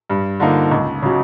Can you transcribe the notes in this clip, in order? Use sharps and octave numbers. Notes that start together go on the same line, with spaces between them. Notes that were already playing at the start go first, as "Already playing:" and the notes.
G2
D3 F3 A#3 D#4
C#2
C#3 F#3